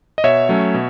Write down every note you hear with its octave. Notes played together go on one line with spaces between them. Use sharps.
D#5
B2 C#5 E5
F#3 A3 C#4
B2